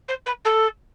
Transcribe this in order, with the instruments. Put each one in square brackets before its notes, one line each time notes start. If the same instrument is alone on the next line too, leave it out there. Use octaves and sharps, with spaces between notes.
[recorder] C5
B4
A4